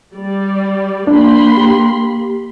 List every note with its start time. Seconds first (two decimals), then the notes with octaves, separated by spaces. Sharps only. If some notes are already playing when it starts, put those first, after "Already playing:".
0.14 G3 D5
1.07 A#3 D4 B5 C6
1.57 G4